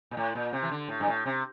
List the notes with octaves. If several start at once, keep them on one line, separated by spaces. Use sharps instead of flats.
A#2
A2
A#2
C3
E3
D3
A2
G2
A2
C3